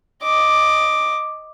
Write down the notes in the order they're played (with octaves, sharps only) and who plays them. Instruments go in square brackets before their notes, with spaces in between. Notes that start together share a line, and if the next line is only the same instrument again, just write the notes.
[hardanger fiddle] D#5 D6